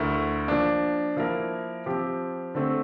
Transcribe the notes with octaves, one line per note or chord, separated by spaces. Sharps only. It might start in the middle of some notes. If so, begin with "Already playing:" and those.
Already playing: D2 D3 A3 E4 A#4
F3 A#3 D4
F3 A#3 E4 A#4
F3 C4 G4
D3 A3 C4